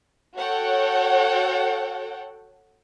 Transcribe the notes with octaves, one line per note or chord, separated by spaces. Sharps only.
F#4 A4 C#5 F#5 G5